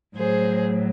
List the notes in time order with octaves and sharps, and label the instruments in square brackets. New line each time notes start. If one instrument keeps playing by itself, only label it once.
[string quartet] A2 F#3 G#4 C5